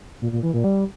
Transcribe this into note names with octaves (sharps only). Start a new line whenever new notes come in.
A#2
A#2
E3
A#2
G3